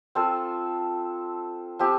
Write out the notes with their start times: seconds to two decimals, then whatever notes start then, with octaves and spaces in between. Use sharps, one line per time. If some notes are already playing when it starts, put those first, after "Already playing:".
0.15 C4 F4 A4 C5
1.79 F3 C4 G4